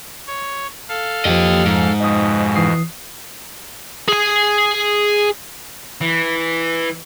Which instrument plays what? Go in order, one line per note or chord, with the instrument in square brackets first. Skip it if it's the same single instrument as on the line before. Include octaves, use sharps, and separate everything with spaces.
[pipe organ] C#5
A4 F5
[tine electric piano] F2 F3 [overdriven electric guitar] G4 D#5
[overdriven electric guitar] G#2
[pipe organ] F2 B2 [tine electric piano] D#5 D#6
[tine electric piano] E3 D#6 C7
[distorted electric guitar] G#4 G#5
E3